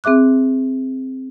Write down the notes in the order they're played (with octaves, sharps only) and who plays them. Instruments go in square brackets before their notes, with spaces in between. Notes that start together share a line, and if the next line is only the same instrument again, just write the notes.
[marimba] C4 G#4 E5 D6 F#6